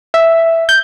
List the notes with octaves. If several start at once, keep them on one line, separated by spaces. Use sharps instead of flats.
E5
G6